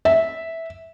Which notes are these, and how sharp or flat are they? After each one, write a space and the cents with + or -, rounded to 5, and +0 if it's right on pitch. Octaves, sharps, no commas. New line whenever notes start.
E5 -10